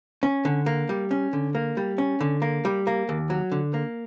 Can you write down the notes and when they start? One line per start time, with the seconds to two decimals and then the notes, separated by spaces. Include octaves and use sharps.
0.23 C#4
0.45 D3
0.66 A#3
0.89 G3
1.11 C#4
1.33 D3
1.55 A#3
1.77 G3
1.98 C#4
2.20 D3
2.42 A#3
2.65 G3
2.87 A#3
3.09 D#2
3.30 F#3
3.52 D3
3.74 A#3